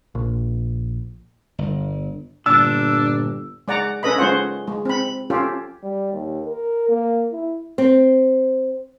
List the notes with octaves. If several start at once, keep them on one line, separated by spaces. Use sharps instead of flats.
A#1
G1
G1 A#2 D4 E6
G#3 D5 F#5 A#5
C#4 A4 B4 D#5 B5
G#3 C#4 F4 C5 F#5
G#3
C4 B5
C#4 F4 G4 A4
G3
D#2
A#4
A#3
E4
C4